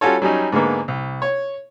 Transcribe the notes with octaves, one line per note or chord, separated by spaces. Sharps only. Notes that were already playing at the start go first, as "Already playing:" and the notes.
G3 C#4 F4 F#4 A4 C#5
F#3 G3 C#4 D#4
G#2 D3 G#3 A#3 B3
C2
C#5